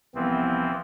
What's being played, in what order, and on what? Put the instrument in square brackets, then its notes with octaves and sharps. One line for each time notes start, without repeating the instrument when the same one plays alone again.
[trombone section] C2 B3 [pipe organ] E3 F3 C4